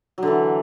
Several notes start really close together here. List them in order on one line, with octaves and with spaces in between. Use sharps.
F#3 D3 E3